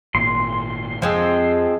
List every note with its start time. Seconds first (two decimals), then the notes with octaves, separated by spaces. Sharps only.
0.15 G#1 A#2 C6
1.02 F2 F3 G#3 C4